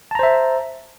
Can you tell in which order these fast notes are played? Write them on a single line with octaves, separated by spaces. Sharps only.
A5 A#5 C5 E5